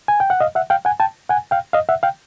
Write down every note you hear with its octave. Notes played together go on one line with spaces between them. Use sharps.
G#5
G5
F#5
D#5 F5
E5 F#5
F5 G5
F#5 G#5
G5 A5
F#5 G#5
F5 G5
D#5 F5
E5 F#5
F5 G5